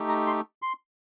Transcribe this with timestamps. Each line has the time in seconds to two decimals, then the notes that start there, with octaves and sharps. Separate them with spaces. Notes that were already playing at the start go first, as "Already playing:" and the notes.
Already playing: A3 D#4 G4
0.09 A#5
0.27 C6
0.62 C6